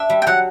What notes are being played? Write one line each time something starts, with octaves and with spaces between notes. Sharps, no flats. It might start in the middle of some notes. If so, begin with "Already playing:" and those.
Already playing: D4 E5
G3
G5
F#3 F#5